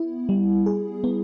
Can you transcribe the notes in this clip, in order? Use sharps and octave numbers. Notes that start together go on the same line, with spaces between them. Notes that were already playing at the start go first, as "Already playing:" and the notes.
Already playing: B3 E4
G3
G#4
B3